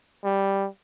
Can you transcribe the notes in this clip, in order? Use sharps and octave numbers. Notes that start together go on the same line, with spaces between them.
G3